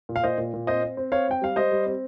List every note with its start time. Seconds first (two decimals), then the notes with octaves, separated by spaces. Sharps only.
0.09 A#2
0.16 F5
0.23 A#2 C5 D#5
0.38 A#2
0.54 A#2
0.67 C4 C5 D#5
0.83 C4
0.97 C4
1.12 C4 C#5 F5
1.27 C4 G5
1.42 G3 F5
1.56 G3 C5 D#5
1.72 G3
1.86 C4